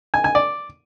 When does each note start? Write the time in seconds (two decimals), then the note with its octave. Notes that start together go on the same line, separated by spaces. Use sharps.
0.14 G#5
0.24 G#5
0.35 D5